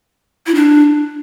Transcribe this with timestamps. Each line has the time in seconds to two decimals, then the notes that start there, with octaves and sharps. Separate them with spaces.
0.47 E4
0.55 D4